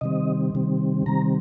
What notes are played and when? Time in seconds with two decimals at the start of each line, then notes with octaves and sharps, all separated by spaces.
0.01 C3 D#3 G3 C4 D#5
0.54 C3 D#3 G3 C4
1.06 C3 D#3 G3 C4 A#5